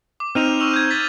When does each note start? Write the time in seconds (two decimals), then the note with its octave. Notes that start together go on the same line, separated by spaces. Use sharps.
0.20 D6
0.35 C4 D#4 C5 F6 D#7 F7
0.60 C#6 E6 F7
0.74 G6 G#6
0.90 A6 B6